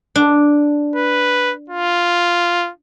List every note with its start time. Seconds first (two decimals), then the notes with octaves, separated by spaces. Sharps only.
0.16 D4
0.96 B4
1.70 F4